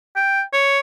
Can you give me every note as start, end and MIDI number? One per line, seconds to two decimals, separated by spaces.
0.16 0.42 79
0.53 0.80 73